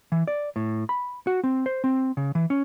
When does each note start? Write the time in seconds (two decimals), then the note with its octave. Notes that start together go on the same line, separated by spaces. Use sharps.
0.12 E3
0.28 D5
0.56 A2
0.89 B5
1.27 F#4
1.44 C4
1.66 C5
1.84 C4
2.17 C#3
2.35 E3
2.50 C#4